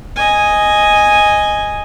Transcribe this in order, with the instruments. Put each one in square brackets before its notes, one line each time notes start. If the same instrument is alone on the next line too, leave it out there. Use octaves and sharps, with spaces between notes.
[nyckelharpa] D#5 G#5